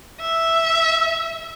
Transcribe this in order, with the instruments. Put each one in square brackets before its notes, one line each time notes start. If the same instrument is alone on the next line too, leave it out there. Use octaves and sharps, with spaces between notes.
[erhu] E5